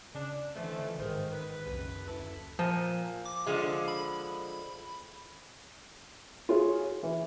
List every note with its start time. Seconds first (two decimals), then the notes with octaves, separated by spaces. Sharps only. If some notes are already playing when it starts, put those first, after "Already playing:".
0.15 C#3 D4
0.55 F2 D3 E3 F3 A3
0.99 A1 G#2 D#3 G#3 A#4 C5
1.33 B4
1.66 F#1 C2
2.08 D2 E4 A4
2.59 A#2 F3
3.25 D6
3.46 D3 F3 G#3
3.88 B5
6.49 F4 F#4 G#4 C#5
7.03 E3